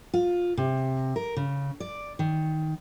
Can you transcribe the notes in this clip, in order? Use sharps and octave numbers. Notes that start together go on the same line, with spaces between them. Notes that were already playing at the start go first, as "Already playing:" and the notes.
F4
C3
A#4
C#3
D5
D#3